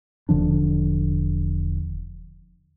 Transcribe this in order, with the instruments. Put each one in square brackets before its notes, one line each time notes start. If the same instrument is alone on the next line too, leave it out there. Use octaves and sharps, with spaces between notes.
[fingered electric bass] E1 D3 F3 D4